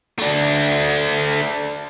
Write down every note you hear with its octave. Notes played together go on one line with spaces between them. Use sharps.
A3 D4